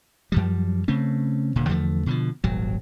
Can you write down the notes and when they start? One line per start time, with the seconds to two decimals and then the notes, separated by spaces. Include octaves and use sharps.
0.32 F#2 F3 G3
0.88 C#3 A3 C4 C#4
1.56 D#1 A#2 D3
1.69 E2 D3 F3 A3
2.06 B2 D3 F3
2.44 D#1 G#1 F#3